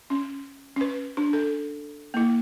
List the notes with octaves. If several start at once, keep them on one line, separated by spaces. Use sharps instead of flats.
C#4
C#4 B4
D4
A4
A#3 E4